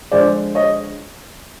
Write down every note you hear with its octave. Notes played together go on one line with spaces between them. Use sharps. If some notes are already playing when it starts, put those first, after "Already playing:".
D3 F3 G#3 C5 D5
C#5 D#5